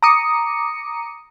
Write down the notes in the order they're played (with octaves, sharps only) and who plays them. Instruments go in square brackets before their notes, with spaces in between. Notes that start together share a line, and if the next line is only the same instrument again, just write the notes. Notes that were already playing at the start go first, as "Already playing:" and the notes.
[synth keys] A#5 D6 D#6 C#7